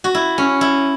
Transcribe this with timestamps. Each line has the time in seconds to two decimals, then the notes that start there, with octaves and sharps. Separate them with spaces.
0.04 F#4
0.15 E4
0.38 C#4
0.61 E4